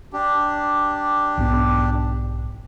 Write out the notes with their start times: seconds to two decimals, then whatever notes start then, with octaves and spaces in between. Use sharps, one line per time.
0.13 D4 G4
1.37 B1 G#2 B3